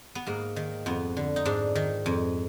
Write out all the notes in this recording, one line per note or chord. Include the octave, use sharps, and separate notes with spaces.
B3
G#2 A#3
D#3
F2 B3
D3
D#4
G#2 D4
D#3
F2